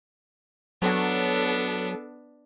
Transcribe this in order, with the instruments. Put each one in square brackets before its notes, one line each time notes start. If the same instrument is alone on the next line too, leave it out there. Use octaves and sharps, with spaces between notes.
[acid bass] F#3 [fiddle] B3 D4 [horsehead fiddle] A4